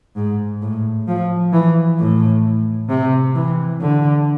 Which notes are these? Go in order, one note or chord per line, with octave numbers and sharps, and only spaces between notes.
G#2
A2
F3
E3
A2
C3
E3
D3